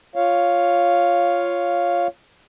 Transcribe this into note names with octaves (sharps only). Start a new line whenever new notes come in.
F4 C#5 F5